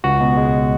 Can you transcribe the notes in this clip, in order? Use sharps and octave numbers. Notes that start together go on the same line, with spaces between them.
C#2 F#4
B2
G#3